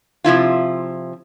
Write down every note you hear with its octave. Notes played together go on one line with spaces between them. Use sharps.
C3 F3 E4 F4